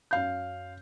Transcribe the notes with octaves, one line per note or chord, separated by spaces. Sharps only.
F#2 F5 G6